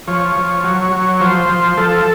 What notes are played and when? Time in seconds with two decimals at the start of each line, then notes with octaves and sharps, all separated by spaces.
0.07 F3 C#5
0.36 F3
0.64 F#3
0.93 F#3
1.21 F3 C5
1.49 F3
1.77 F3 A4